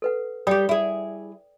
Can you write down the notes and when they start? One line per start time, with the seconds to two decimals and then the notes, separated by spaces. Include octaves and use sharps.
0.02 A4 B4 F#5
0.47 G3 G4 D5 G5 D#6
0.69 E4 G#4